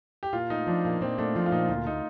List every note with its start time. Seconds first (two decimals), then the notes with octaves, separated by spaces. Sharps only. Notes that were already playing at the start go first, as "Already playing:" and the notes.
0.23 G4
0.33 A#2 F4
0.50 A3 D#4
0.67 F3 D4
0.85 A#2 A#3
1.01 A#2 C4
1.18 A3 D4
1.36 F3 F4
1.46 F4
1.52 A#2 D#4
1.69 D2 F4
1.86 A3 D#4